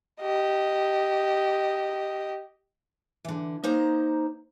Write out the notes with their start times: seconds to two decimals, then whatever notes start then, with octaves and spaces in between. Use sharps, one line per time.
0.20 G4 D#5
3.25 D3 E3
3.64 A#3 D#4 C5 A#5